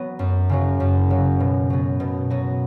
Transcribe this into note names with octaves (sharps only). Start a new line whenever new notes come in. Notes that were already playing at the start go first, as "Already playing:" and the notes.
Already playing: F#3 B3
F#2
C#3 F#3
F#2
C#3 F#3
B2
F#3 B3
B2
F#3 B3